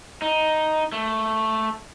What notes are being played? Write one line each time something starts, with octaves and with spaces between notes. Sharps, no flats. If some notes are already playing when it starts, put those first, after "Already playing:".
D#4
A3